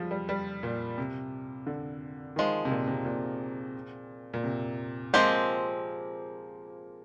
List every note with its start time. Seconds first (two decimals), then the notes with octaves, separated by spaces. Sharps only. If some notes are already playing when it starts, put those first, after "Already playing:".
Already playing: F3 G3 G#3
0.11 G3
0.29 G3
0.63 A#2
0.98 C3
1.67 D3
2.36 D#3 F3 G#3
2.65 C3
2.71 A#2
2.87 C3
3.05 A#2
4.34 A#2
4.44 C3
5.13 F3 G#3 A#3 C4 G4